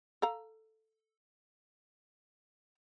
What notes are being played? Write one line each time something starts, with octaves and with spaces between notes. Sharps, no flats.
A4 F5 A#5